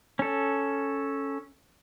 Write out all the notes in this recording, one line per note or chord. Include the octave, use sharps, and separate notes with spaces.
C#4 A4